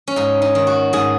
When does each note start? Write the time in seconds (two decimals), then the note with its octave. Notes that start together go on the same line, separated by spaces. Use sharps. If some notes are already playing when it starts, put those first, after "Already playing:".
0.08 C#4
0.16 G#2 D#4
0.42 D#4
0.55 D#3
0.67 F#4
0.93 G#2 G#4